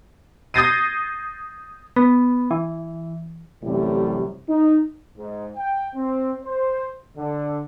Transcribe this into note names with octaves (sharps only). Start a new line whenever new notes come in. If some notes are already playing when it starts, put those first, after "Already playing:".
D#6 G6 A6 A#6 C7 D#7
B3
E3
A1 F#2 A2 C3 G3
D#4
G#2
G5
C4
C5
D3